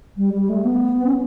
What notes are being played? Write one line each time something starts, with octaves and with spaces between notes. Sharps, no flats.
G3
G3
A3
B3
C#4